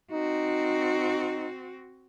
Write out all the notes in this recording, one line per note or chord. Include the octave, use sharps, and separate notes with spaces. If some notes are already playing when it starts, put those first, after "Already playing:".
C4 D#4 F#4